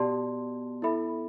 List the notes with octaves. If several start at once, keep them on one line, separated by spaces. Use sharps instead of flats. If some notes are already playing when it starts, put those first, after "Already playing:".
Already playing: B2 G4 D5 A5 C6
E4 A4 E5 B5